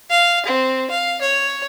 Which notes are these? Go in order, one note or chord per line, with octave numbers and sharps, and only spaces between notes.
F5
C4
F5
C#5